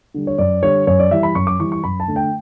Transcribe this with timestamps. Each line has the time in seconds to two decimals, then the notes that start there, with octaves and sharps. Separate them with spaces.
0.14 D3 G3
0.27 C#5
0.38 F#2 D5
0.63 D3 G3 C#5
0.87 F#2 C#5
0.99 D5
1.11 E3 G3 E5
1.23 B5
1.35 F#2 C#6
1.47 D6
1.59 E3 G3 C#6
1.72 C#6
1.84 F#2 B5
2.00 A5
2.08 D3 A3
2.16 G5